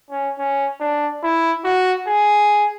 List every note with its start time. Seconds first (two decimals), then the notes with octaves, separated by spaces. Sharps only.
0.10 C#4
0.38 C#4
0.80 D4
1.23 E4
1.64 F#4
2.07 G#4